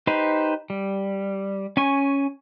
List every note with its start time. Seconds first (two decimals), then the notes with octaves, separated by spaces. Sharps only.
0.07 D#4 G4 B4 C5
0.70 G3
1.77 C#4 G#5 C#6